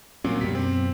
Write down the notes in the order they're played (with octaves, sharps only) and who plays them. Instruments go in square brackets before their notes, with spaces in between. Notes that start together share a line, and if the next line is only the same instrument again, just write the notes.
[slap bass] D2 C4 C#4 [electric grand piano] A#2 F#3
[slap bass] F#2 B2 [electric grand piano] G3 B6
[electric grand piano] C4